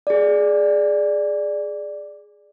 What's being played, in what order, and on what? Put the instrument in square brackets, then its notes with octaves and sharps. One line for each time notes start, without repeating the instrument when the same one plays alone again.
[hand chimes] G#4 D5